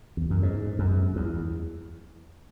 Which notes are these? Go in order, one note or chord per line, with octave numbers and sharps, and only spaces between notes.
E2
F#2
G#2
F#2
E2